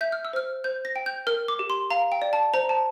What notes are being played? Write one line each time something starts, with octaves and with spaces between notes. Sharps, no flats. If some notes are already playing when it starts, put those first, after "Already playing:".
E5 G6
F6
E6
C5 F6
C5 G6
A#6
G5
G6
A#4 F6
D6
G4
C6
F5 A#5
G5
D5
A5
C5 A#5
A5